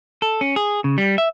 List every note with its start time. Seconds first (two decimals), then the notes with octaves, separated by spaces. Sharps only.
0.22 A4
0.41 C#4
0.56 G#4
0.84 C#3
0.98 G3
1.18 E5